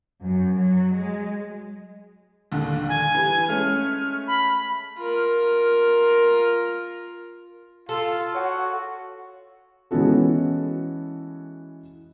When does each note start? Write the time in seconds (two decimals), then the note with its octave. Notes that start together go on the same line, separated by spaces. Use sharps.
0.21 F#2
0.55 F#3
0.92 G#3
2.52 A#1 D#2 D3
2.89 G#5
3.14 E3 G3
3.48 G#3 A3 C#4 F6
4.27 B5
4.98 F4 A#4
7.89 F4 A4
8.35 F#4 C#5 F#5
9.91 E3 G#3 B3 C#4 F#4 A4